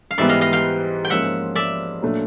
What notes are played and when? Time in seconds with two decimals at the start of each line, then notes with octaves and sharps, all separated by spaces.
0.11 F5
0.18 G#2 E3 G3 B3 D5 E5
0.29 D#5 F5
0.41 D#5 F5
0.53 F5 G5
1.05 G5
1.10 G#2 F3 A#3 C#4 E5 F#5
1.55 D5 E5
2.02 A#2 F#3 A3 D4